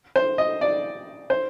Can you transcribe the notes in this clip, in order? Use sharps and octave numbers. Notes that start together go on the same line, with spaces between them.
C5
D#5
D5
C5